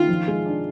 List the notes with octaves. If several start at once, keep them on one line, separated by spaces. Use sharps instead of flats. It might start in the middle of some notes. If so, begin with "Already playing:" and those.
Already playing: D#3 F4
F3
G#3
D4